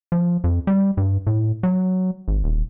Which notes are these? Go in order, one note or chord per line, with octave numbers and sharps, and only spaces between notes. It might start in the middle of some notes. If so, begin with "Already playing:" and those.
F3
F2
G3
G2
A2
F#3
G#1
D#1